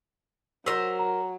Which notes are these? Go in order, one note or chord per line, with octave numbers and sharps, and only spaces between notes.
F#3 A#4 C5 E6 B6
A#5